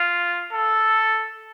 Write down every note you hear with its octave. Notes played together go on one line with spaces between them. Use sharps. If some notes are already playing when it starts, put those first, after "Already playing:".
Already playing: F4
A4